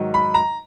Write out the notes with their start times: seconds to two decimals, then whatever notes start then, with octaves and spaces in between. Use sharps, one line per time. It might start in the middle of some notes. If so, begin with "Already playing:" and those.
Already playing: G#2 D#3 F#3
0.14 B5
0.34 A#5